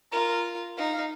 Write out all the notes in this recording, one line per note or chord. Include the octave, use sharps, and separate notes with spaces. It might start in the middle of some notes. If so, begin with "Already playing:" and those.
F4 A#4
D#4 F5